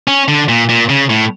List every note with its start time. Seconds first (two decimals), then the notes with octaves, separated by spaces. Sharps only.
0.08 C#4
0.28 D3
0.49 A#2
0.69 A#2
0.89 C#3
1.10 A2